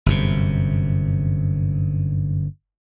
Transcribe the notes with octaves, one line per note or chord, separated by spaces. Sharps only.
G1 F#2 C3